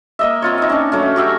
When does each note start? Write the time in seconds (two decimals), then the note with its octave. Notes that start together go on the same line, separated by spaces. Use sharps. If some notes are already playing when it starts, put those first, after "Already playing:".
0.19 A#3 D#5 E5
0.42 C4 F4 C#5
0.58 D#4 E5
0.69 C#4 D4
0.92 F#3 A3 C#4
1.16 F#4 G4 E5